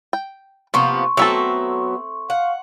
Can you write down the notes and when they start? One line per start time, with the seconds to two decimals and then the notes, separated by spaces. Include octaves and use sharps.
0.13 G5
0.74 C3 F3 A#3 B3 C6 C#6
1.17 F#3 A3 B3 C4 A4 E5
2.30 F5 F#5